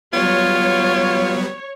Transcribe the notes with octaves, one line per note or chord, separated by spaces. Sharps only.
F#3 G3 B3 F4 C#5